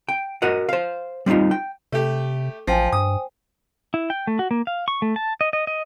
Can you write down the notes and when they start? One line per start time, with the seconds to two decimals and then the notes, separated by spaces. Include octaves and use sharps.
0.09 G5
0.42 F#4 A#4 D#5 F#5
0.69 C5 F5
1.26 G3 C4 C#4 D#4 F4
1.51 G5
1.92 C3 A3 G4
2.67 A1 F3 C5 G5 G#5
2.92 G2 D#6
3.94 E4
4.10 G5
4.27 A3
4.39 F#4
4.51 A#3
4.67 F5
4.88 C#6
5.02 A3
5.16 A5
5.41 D#5
5.53 D#5
5.67 D#5